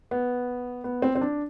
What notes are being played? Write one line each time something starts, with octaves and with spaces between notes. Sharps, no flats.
B3
B3
C4
C4
D4